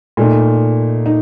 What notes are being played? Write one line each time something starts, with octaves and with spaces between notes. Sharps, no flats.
A#2 A3 D#4
D#4